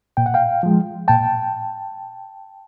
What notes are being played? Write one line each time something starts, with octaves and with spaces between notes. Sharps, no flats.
A#2 G5
F#5
F5 G5
F3 G#3
A#2 G5 A5